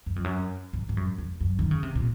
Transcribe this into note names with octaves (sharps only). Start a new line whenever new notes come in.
F#2
F2
F#2
G#2
G#2
F#2
F2
F#2
D#3
C#3
C3
A#2